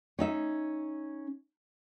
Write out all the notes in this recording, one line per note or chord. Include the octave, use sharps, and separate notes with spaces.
C#4 D#4 E5